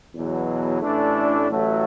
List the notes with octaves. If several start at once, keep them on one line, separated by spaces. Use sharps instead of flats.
E2 B2 F#3
A1 A2 E3 A3 D4
A1 A2 F#3 A3